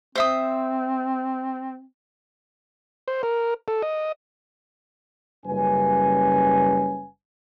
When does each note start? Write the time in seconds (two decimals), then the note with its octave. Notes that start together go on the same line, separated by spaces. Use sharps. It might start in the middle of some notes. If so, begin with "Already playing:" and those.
0.15 C4 C5 E5 D#6
3.08 C5
3.23 A#4
3.68 A4
3.82 D#5
5.46 F#1 G3 C#4 B4 G#5